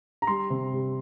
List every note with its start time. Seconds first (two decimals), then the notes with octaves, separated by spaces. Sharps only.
0.22 A#5
0.27 G3 C6
0.50 C3
0.73 G3